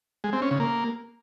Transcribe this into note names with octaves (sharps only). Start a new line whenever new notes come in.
G#3
C4
C#4
C#3
A#3